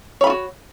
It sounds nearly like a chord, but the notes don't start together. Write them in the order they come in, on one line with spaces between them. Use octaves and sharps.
C#5 B5 F4 F#4